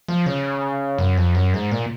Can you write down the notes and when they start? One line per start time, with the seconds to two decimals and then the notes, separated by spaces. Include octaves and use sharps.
0.08 F3
0.26 C#3
0.98 F#2
1.17 F2
1.35 F#2
1.54 G#2
1.71 A#2